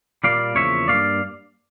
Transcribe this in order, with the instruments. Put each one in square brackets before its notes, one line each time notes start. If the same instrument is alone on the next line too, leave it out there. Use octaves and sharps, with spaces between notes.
[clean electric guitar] A#2 G3 A#3 D5 F5
E2 C#3 F3 A#3 C#5 E5
G2 F3 A#3 D5 F5